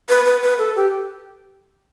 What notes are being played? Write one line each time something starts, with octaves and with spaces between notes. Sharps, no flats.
B4
B4
B4
A4
G4